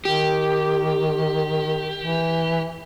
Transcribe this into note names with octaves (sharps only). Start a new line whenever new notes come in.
D#3 G4
E3